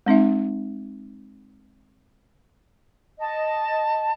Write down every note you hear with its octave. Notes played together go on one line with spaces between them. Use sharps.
G#3 C4 D#4 E5
D#5 A5